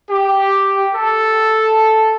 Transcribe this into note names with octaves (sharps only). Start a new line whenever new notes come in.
G4
A4